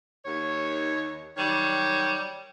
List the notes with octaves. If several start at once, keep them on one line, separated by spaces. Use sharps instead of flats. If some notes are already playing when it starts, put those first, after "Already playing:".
D#2 C#5
D#3 F#3 G3 C#5